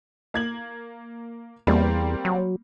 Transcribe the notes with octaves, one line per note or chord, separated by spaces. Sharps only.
A#3 G#6 F#7
E2 G3 A#3 C4
F#3